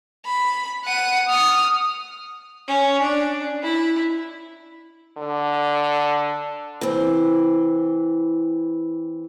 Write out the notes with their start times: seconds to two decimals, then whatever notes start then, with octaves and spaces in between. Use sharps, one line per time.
0.26 B5
0.85 F#5 D#7
1.28 D#6 F6
2.68 C#4
3.02 D4
3.63 E4
5.18 D3
6.81 E3 C4